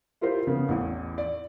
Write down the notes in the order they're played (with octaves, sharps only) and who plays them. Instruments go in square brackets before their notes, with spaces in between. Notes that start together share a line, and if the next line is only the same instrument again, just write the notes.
[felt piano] E4 F4 G4 A#4 C5
C#3 B3
A1 E2
D5